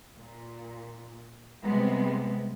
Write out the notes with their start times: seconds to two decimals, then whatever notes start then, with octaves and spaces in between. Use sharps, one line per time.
0.19 A#2
1.63 C3 G3 G#3 B3